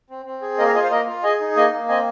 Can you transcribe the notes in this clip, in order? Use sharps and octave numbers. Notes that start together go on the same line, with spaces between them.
C4
C4
G#4
A#3 A#4 D#5
F5 A#5
F4 D#5 G#5
C5 F5
A#3 A#4 D#5
F4
G#4 D#5 G#5
D#4
A#3 D#5 G#5
A#3
C4 D#5 G#5